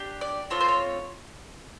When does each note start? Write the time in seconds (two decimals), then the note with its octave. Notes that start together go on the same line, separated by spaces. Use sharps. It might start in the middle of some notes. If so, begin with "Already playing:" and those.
Already playing: D4 G4
0.21 D5
0.50 A3 C4 F4 C#5
0.61 C5
0.68 C#5